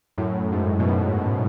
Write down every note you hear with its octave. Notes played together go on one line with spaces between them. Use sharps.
F#2 A2
G#2
B2
F#2 A2